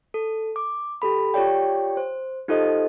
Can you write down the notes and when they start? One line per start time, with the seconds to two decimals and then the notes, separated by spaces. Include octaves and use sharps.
0.14 A4
0.56 D6
1.02 G4 A4 B5
1.34 F4 G4 C#5 D5 G5
1.97 C5
2.48 D#4 F4 G4 A4 C5 D#5